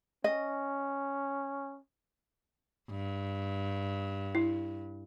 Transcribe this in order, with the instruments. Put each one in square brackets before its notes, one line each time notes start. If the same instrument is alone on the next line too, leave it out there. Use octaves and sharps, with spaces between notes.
[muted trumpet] C#4 [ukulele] D#5
[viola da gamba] G2
[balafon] E4